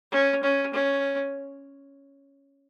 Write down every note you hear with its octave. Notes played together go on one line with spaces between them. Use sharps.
C#4
C#4
C#4